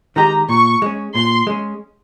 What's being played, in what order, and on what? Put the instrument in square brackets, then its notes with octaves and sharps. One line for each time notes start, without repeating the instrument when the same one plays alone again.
[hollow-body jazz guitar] D#3 G#3 D#4 G4 [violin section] A#5
[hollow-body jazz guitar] A#2 [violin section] C#6
[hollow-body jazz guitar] G#3 C#4
[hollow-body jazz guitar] A#2 [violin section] C6
[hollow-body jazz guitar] G#3 C#4